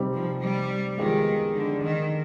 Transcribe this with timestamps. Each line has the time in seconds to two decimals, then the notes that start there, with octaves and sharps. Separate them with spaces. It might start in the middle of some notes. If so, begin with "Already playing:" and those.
Already playing: C3 G3 C4 D#4
0.13 F3
0.41 G3
0.98 D#3 F3 G#3 B3 D#4 G4
1.55 D3
1.83 D#3